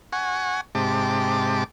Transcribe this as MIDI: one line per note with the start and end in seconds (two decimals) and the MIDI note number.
0.13 0.61 78
0.13 0.61 80
0.13 0.61 85
0.75 1.64 44
0.75 1.64 48
0.75 1.64 67
0.75 1.64 81
0.75 1.64 86